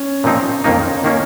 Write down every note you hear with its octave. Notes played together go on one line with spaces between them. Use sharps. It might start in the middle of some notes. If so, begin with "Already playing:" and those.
Already playing: C#4
A#2 F3 C4 D#4
F2 D#3 A#3 C4 D#4
C#4
D#3 A#3 C#4 D#4